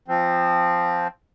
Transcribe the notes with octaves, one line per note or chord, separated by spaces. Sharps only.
F3 C4